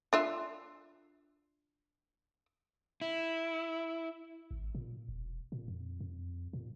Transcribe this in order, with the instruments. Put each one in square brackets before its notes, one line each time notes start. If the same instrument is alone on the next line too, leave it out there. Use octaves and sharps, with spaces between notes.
[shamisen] D4 F4 E5
[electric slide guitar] E4
[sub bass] G#1
A#2
E1
A#2
F2
F2
A#2